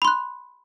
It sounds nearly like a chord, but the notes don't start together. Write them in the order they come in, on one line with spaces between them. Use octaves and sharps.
B5 C6 F#6